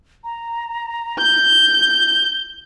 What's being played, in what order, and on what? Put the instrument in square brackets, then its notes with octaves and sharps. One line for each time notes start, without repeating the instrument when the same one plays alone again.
[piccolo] A#5
[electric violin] G6 [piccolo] G7